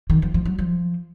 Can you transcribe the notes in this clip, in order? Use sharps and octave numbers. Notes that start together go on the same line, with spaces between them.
D#3
F3
F3
F#3
F3